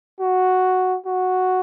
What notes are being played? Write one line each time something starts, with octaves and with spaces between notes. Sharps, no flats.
F#4
F#4